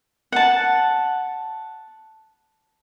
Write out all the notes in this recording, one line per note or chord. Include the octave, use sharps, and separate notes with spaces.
F#5 A5